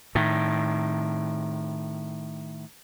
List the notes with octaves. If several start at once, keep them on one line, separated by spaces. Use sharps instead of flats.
A2 D#3